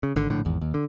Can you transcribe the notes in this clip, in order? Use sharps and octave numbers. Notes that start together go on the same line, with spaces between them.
C#3
G#1 D3
A#1 A2 D3
G#1 E2
D#2
D3